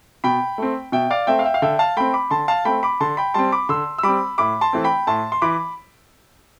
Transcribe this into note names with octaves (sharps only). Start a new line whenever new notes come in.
B2 G5 B5
A3 C4
B2 E5 G5
D5 F5
A3 C4 E5 G5
F5
E5 G5
F5
D3 E5 G5
F5 A5
A3 C4 G5 B5
B5 D6
D3 A5 C6
F5 A5
A3 C4 G5 B5
B5 D6
D3 A5 C6
G5 B5
G3 C4 A5 C6
B5 D6
D3 C6 E6
E6
G3 C4 B5 D6
A2 B5 D6
A5 C6
E3 A3 C4
G5 B5
A2 A5 C6
C6
E3 B5 D6